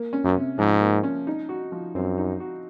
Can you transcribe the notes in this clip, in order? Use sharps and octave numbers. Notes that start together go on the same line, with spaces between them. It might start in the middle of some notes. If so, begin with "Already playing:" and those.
Already playing: A#3
C#4
F#2
C3
G#2 F3
A#3
C#4
D#4
F#4
F3
F#2 C4
D#4
F#4